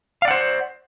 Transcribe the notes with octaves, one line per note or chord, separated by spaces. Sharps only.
C5 D5 F5 F#5